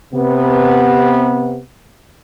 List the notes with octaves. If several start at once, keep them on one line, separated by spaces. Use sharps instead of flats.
C3 B3